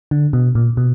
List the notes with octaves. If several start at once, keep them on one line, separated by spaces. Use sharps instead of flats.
D3
B2
A#2
B2